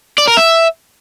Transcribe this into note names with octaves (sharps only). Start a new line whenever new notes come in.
D5
A#4
E5